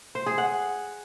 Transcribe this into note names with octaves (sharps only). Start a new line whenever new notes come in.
C5
G#4
F#5